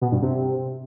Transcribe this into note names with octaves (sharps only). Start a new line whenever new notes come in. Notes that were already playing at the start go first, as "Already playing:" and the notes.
B2
G2
C3